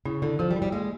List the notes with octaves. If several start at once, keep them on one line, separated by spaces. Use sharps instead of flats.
C#3 E4
D3 E4
F3 A4
G3
E4
G3
G#3 A#3